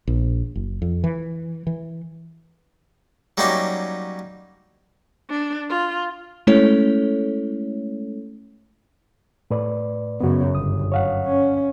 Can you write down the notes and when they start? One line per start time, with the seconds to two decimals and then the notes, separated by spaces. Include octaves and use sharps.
0.07 A#1
0.56 F#1
0.82 F2
1.04 E3
1.67 E3
3.38 F#3 G3 A#3 C#4 D#4 G4
5.30 D4
5.69 F4
6.47 G#3 A3 C#4 E4 A4 C#5
9.51 A2 B4 D5
10.21 F#2 C#3 B3 F#4
10.55 G1 D#6
10.92 F#2 C#5 F5 F#5
11.25 C#4